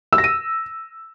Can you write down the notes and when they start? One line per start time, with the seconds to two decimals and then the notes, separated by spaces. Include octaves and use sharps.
0.13 E6
0.18 A#6
0.24 D#7